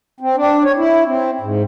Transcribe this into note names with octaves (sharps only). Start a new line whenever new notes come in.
C4
D4
C#5
E4
C4
G#2